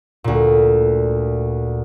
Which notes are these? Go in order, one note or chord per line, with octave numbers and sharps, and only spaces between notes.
D2 A#2